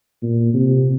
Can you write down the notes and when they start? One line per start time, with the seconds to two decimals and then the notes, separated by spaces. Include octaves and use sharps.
0.22 A#2
0.54 C3